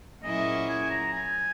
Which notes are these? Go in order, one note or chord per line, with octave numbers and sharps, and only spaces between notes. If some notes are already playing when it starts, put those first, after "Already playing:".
A#2 F#3 C#4 E4 G#4 D#5
G#5
A#5
G#5